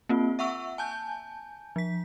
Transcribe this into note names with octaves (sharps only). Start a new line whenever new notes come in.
A#3 C4 F4
E5 F#5 C#6 E6
G#5 A5 G6
F3 B6